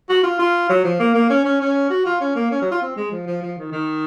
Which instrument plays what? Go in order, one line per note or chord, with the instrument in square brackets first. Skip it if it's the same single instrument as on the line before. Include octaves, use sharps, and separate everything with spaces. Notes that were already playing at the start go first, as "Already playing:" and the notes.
[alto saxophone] F#4
F4
F4
F#3
F3
A#3
A#3
C#4
C#4
C#4
F#4
F4
C#4
A#3
C#4
F#3
F4
C4
G#3
F3
F3
F3
D#3
D#3